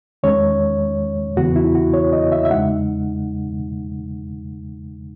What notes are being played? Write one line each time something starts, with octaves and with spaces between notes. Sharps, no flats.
E2 D#3 G#3 C#4 C#5
E2 C#3 E3 B3 F#4
E4
F#4
C#5
D#5
E5
E5
E2 C#3 G#3 D#4 F#5